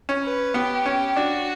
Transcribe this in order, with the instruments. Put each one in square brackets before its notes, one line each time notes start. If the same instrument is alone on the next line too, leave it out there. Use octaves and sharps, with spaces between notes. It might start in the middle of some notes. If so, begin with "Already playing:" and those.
[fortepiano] C#4
[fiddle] B4
[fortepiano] B3 [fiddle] G4
[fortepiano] C#4
[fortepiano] D4 [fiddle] F#4